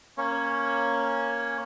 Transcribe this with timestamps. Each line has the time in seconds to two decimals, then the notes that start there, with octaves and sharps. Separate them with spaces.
0.18 A#3 C#4 C#5